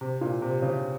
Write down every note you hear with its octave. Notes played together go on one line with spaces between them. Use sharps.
C3
A#2
C3
C#3